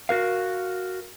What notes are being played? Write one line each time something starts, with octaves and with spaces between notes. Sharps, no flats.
F#4 A#4 F5